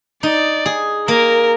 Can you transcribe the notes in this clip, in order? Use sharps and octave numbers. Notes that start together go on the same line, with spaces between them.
D#4 D5
G#4
A#3 A#4